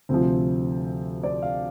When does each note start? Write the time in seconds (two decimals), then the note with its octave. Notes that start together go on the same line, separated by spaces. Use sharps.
0.09 D2 C3 F3 C4
1.23 D5
1.42 F5